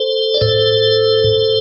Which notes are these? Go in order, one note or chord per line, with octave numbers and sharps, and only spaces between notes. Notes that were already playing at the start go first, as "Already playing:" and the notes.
Already playing: A4 C5
D5
A2 A4 C5